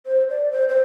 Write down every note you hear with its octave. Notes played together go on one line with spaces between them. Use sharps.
C5
D5
C5
C5